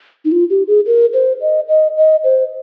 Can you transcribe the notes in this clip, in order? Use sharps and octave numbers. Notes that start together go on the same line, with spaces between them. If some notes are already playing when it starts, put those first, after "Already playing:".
D#4
F4
G4
G#4
A#4
C5
D#5
D#5
D#5
C5